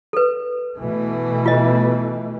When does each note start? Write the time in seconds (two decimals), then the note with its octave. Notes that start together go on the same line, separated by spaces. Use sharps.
0.13 A4 B4
0.78 B2 E3 A3
1.46 F4 D#5